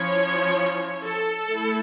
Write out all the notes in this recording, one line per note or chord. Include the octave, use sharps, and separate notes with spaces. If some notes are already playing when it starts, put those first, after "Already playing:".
Already playing: F3 C#4 E4 C#5
A4
A3 E4